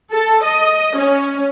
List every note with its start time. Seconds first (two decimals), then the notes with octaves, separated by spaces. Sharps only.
0.12 A4
0.44 D#5
0.97 C#4